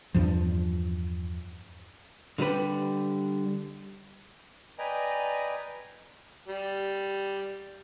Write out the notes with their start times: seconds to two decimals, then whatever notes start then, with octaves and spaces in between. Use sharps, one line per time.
0.14 E2 G2 F3
2.38 D3 G3 G4 B4
4.79 B4 D5 D#5 G5 G#5 A#5
6.48 G3